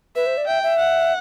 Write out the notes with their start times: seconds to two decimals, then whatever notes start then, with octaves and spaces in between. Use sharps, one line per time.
0.16 B4 E5
0.26 C5
0.37 D5
0.47 E5 G5
0.63 E5
0.79 F#5